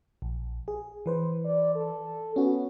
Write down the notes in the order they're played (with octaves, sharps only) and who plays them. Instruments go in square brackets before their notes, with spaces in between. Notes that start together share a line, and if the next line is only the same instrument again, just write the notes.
[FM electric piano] A#1
G#4
E3 B4 C5
[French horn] D5
A4
[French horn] B3 [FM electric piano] C#4 F#4